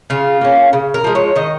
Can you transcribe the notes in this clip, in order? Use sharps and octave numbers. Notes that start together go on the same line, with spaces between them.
C#3 F4
A#3 C#4
C#3
A#4
F3 G#3
C#5
D#3 D#5